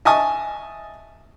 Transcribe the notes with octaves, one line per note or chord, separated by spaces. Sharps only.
D#5 E5 G#5 A5 C#6 D#6